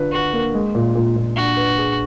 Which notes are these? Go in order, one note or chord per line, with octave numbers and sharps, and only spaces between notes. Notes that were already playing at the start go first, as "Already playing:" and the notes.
Already playing: D3 F4 B4
F#4 B4
A#3
G#3
A#2
A#2
A#2
D4 F#4
B4
G#4